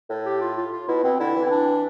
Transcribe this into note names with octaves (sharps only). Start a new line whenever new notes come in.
A2
G4
F4
F4
F4
B2 E4
B2 C4
D3 E4
E3
C4
D4